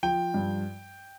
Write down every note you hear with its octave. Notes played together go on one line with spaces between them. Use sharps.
F3 G5
G2